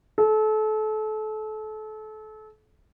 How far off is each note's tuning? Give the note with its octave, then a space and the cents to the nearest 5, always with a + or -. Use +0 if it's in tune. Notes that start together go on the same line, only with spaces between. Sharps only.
A4 -30